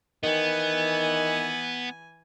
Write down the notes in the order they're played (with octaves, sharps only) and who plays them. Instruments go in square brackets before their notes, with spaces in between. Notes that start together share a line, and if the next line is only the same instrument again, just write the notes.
[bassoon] D#3 [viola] E3 G#5 [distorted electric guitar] B3